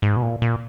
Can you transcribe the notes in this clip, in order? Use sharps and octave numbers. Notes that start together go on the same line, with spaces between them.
G#2
B2
A#2
A#2